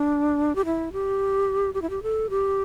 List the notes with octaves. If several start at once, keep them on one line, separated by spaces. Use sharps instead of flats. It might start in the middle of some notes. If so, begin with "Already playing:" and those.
Already playing: D4
G4
E4
G4
G4
E4
G4
A4
G4